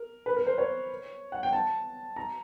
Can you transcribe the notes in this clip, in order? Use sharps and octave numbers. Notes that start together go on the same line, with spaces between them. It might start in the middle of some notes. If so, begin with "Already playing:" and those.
Already playing: A#4
B4
A#4
C5
C#5
F#5
G5
A5
A#5